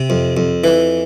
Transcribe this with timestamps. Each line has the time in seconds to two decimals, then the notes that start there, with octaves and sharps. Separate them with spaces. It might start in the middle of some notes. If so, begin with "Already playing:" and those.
Already playing: C3
0.10 F2
0.37 F2
0.64 E3